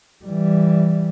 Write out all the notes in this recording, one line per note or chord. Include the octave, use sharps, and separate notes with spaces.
E3 G3